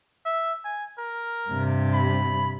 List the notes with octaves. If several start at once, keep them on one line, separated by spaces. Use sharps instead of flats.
E5
G#5
A#4
G2 C3
B5